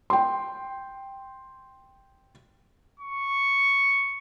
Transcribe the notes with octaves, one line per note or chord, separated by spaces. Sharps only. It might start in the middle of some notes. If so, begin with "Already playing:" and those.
G5 C6
C#6